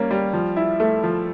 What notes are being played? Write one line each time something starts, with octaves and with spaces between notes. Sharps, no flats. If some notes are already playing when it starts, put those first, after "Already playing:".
Already playing: G3 A#3 C#4
G3
F3
E4
A3
F3